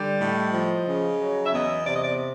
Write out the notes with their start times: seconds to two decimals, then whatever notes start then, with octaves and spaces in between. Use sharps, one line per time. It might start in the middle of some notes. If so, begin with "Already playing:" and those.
Already playing: D3 G3 D5
0.20 A2 D#5
0.53 F3
0.87 C#3
1.19 F#3
1.45 E5
1.53 E2 D#5
1.86 C3 D5
1.95 D#5
2.03 D5